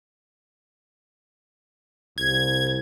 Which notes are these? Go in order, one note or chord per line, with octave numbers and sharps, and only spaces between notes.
C2 G#6